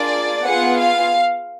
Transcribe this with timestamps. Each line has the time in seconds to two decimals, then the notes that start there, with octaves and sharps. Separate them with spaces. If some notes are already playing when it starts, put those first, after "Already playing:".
Already playing: A#3 D4 F4 G#4 D5
0.43 B3 F4 G#4 F#5
0.79 F5